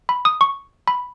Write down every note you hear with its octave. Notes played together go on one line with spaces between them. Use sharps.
B5
D#6
C#6
B5